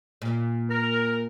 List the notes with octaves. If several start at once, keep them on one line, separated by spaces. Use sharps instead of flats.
A#2
A#4